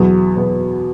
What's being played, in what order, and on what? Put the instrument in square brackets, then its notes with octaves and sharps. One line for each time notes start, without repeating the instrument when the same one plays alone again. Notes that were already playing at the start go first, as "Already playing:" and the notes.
Already playing: [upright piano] E2 B2 B3 [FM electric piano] F#3 F#4
[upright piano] E2 B2 B3